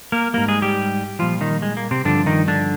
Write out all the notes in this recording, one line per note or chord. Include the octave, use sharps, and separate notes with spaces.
A#3 A#4
G#2 G3 A#3 A#4
G#3 G#4
G3 G4
A#2 F3 G3 F4
D#3 D#4
G#3
A#3
C3 C4
G2 D3 F3 D4
D#3 D#4
D3 D4